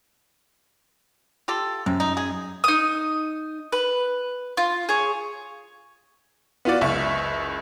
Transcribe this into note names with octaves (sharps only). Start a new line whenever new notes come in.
F4 G4 A4
F#2 C3
D#4
G#4
D#4 D#6
B4
F4
G#4 C#5
B3 F4 F#4 D5
F#1 C#2 E5 C#6